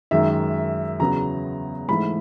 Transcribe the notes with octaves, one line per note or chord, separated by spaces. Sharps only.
F#2 D#3 G#3 E5
E2 C#3 F#3 B3 A#5
G#2 E3 A3 B5